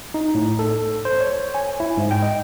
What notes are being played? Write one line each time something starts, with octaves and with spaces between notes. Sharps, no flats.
D#4
A2
A4
C5
C#5
G#5
E4
G#2
G5
D#5